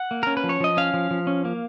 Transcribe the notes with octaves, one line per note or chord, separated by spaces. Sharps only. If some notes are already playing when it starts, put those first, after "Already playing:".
Already playing: F#5
A#3
C#4 A#4
B4
F3
C#5
F3 D#5
C#4 F5
F3
F3
C#4
A#3